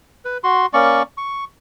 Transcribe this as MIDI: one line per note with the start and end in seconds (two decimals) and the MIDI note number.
0.25 0.38 71
0.44 0.66 66
0.44 0.66 84
0.74 1.02 58
0.74 1.02 61
0.74 1.02 74
0.74 1.02 85
1.17 1.44 85